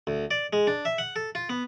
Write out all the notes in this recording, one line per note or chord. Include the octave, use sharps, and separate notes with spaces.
D2
D5
G#3
D4
E5
F#5
A4
F4
B3